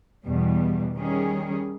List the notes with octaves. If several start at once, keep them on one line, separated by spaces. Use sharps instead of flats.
E2 B2 G3
D#3 G3 C#4 G#4